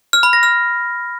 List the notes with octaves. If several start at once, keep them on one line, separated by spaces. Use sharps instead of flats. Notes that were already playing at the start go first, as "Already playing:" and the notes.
F6
B5
A#6
F6